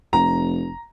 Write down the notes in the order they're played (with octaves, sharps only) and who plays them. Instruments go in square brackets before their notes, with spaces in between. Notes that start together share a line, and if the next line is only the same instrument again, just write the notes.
[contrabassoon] F1 [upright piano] A#5